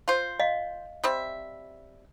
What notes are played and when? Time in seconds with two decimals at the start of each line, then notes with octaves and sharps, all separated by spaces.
0.08 F4 C5
0.40 D#5 F5
1.04 G3 C4 E5